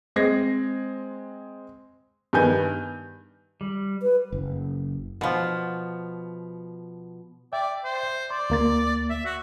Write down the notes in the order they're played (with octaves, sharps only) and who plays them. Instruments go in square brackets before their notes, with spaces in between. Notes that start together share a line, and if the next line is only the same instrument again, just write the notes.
[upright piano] G#3 C4 G#6 A#6 C7
G2 D#3 B3 G#5 G6
[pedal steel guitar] G3
[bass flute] B4
[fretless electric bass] F#1
[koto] B2 F3
[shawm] D5 [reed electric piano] E5 G5
[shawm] C5
[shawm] D5 [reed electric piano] C6
[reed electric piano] D2 A#3 A6
[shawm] E5
F#4